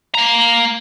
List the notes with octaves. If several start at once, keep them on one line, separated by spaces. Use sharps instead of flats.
A#3 A#5